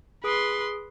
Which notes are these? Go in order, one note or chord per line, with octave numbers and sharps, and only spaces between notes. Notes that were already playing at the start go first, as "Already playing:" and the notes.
G#4 B4 C6 D#6 D7